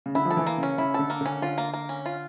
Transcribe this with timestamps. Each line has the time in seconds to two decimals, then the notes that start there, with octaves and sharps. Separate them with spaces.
0.06 C#3
0.15 D3 E4
0.25 F3
0.31 A4
0.37 E3
0.47 A#3
0.58 C#3 C#4
0.78 C#3 E4
0.94 D3 A4
1.10 A#3
1.21 D3 C#4
1.42 D3 F4
1.58 A#3
1.74 A#3
1.89 C#4
2.06 F4